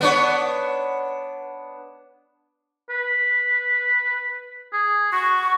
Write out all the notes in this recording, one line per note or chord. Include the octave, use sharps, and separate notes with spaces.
B3 D4 C#5
B4
G#4
F#4 C#6